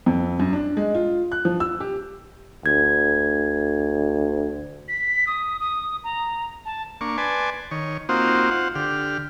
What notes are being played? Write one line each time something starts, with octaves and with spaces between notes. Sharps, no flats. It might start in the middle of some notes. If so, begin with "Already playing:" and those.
F2
F#2
D4
G#3
F4
F#6
F3
E6
G4
D2 G#6
B6
D#6
D#6
A#5
A5
A#3 D4 C#6
B4 D5 G#5 A5 C6
D#3 C#5
A#3 C4 D#4 F4 F#4 C5
F4 C5 F#5
D3 G4 F6